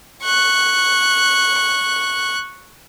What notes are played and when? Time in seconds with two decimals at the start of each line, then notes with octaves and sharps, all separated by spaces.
0.23 C#6 F#6